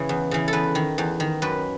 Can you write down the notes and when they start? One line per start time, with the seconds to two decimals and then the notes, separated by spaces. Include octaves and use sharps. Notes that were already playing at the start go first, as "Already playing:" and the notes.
Already playing: C#3 E3
0.09 E2
0.31 C#3 E3
0.48 A4
0.53 E2 B4
0.75 D#3
0.98 E2
1.20 D#3
1.42 F#2 B4